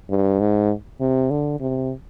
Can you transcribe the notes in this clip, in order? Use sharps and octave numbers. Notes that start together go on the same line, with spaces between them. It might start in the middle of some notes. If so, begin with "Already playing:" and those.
G2
G#2
C3
D3
C3